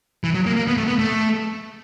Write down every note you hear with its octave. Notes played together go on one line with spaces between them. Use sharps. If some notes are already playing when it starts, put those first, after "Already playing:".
E3
F#3
A#3
A#3
B3
A3
B3
A3